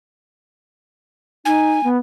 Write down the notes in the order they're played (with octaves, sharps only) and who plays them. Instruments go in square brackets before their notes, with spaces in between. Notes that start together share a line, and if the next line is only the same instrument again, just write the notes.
[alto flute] D#4 [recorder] G#5
[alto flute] B3